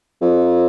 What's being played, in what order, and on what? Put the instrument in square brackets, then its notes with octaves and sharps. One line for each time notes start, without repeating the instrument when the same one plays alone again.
[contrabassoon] F2